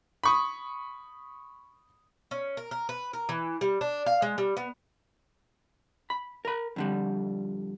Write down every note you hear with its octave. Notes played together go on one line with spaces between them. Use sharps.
B5 C#6 D#6
C#4
A#4
A#4
B4
A#4
E3
G3
D4
F5
G#3
G3
B3
B5
A#4 B5
F2 D3 G3